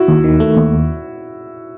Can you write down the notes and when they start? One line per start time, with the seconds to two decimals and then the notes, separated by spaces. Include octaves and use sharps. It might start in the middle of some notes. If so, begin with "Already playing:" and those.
Already playing: E4 F#4
0.08 D#2
0.24 D#3
0.40 A3
0.57 D#2